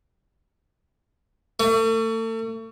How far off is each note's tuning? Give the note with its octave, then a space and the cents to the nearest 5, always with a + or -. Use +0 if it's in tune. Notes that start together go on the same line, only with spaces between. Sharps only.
A3 +40